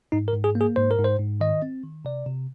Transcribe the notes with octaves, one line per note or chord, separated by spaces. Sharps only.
G#2 D#4
A#4
G#2
G#4
A#3
G#4
G#2 C5
A#4
G#2
C5
G#2
D#3 D#5
C4
D#3
C3 D5
C3